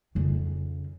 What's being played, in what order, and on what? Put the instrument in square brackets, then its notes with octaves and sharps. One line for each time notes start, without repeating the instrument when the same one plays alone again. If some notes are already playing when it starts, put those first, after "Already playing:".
[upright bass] F2 C#3